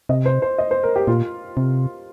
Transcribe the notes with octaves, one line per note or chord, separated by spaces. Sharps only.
C3 D#5
C5
C5
D#5
C5
A#4
G4
A#2 F4
C3